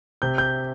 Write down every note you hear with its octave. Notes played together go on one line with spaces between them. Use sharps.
C3 G6
G6